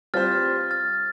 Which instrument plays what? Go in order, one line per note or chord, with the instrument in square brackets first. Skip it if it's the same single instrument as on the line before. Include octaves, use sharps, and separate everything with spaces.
[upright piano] G3 C4 F4 C5 [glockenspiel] F6 A6
[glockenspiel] F6 A6